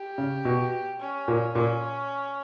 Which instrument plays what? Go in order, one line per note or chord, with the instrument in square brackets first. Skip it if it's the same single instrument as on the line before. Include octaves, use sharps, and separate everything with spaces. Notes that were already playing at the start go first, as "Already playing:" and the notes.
Already playing: [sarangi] G4
[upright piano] C#3
B2
[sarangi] C#4
[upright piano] A#2
[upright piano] A#2 [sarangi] C#4